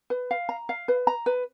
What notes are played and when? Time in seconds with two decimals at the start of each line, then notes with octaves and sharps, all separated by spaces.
0.10 B4
0.31 F5
0.49 A#5
0.69 F5
0.88 B4
1.07 A#5
1.26 B4